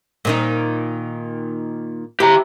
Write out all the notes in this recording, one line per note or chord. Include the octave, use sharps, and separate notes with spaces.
A#2 D#3 D#4
E4 G4 A#5